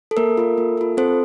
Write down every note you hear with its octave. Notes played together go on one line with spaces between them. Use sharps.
A4
A#3 A#4
F4 A4
A#3
F4 A4
C4 A4 C5